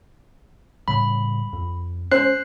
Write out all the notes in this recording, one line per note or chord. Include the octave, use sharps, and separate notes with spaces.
A2 C#3 G3 B5
F2
C#4 C5 F#6 C7